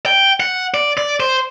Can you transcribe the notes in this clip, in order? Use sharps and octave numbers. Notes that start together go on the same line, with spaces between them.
G5
F#5
D5
D5
C5